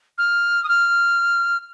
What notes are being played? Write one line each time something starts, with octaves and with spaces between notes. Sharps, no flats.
F6
D#6
F6